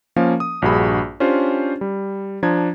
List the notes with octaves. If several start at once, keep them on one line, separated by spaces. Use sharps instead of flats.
F3 A#3 C#4 A#4 F5
D#6
A#1 G2 F#4 G#4 B5
C#4 D4 F4 G4 C5
G3
F3 D4 A#5 G#6